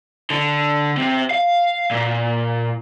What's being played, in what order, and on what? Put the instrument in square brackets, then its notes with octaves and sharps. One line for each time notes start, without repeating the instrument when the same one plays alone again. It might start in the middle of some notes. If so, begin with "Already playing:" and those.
[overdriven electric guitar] D3
C3
F5
A#2